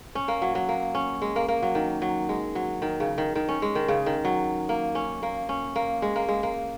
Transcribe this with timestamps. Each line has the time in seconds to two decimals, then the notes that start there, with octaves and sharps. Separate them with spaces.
0.15 C#4
0.28 A#3
0.42 F#3
0.55 F#3
0.69 A#3
0.95 C#4
1.22 G#3
1.36 A#3
1.48 A#3
1.63 F#3
1.75 D#3
2.02 F#3
2.29 G#3
2.55 F#3
2.82 D#3
3.00 C#3
3.18 D#3
3.35 D#3
3.49 C#4
3.62 G#3
3.75 D#3
3.88 C#3
4.06 D#3
4.25 F#3
4.69 A#3
4.95 C#4
5.23 A#3
5.49 C#4
5.76 A#3
6.02 G#3
6.16 A#3
6.29 G#3
6.43 A#3